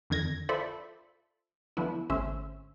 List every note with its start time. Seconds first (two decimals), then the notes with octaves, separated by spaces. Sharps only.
0.10 F2 D3 D#3 G#6 A#6
0.49 F4 A4 C5 D5 E5 B5
1.77 D3 F3 B3 E4
2.10 G#1 D3 A3 C#4 C5 E5